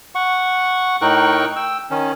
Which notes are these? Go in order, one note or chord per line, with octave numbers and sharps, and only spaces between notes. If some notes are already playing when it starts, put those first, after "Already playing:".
F#5 C#6
A2 D#4 A#4 G5 C#6 F#6
G5 E6
D#3 C#4